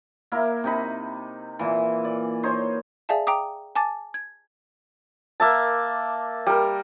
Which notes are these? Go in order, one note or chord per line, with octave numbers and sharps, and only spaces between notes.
A#3 E4 A#4
C3 D#4 B5
A#2 E3
D5
D#4 C5 C#5
G#4 D5 E5 F5 G#5 A5
G5 A#5 D6 D#6
G#5 A5 D6 A6
G#6
A#3 E5 A5
G3 A#4